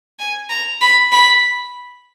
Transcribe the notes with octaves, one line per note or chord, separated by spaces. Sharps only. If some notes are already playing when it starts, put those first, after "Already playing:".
G#5
A#5
B5
B5